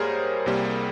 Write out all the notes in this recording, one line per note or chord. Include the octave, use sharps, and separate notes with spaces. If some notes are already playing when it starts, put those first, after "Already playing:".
Already playing: G#2 G3 A#3 G#4 A#4 C5 C#5 C6
C2 C3 G3 A#3